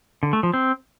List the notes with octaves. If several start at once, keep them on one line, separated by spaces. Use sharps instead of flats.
D3
A3
F3
C4